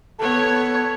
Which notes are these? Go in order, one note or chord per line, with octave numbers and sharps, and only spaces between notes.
B3 A4 C#5